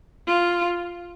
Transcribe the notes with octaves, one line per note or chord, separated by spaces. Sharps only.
F4